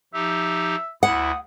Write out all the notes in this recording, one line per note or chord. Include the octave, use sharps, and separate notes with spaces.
F3 D#4 G4 E5
D2 E4 F#5 D#6